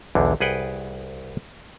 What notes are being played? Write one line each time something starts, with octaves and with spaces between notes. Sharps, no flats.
B1 E2 D3
C2 G#4 B4 F#5 G5